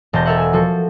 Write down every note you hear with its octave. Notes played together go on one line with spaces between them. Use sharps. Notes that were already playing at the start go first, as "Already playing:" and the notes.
E1 A5 G6 A#6
A4 A#4 E5 F#5
G#5 E7
F3 F#4 A4